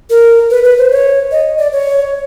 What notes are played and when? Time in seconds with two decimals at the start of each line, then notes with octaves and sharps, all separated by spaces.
0.10 A#4
0.50 B4
0.64 B4
0.78 C5
0.91 C#5
1.31 D#5
1.58 D5
1.72 C#5